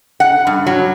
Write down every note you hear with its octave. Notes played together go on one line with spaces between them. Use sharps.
F#5
G2
F#3